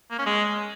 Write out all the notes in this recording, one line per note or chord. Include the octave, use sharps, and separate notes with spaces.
A#3
C#4
G#3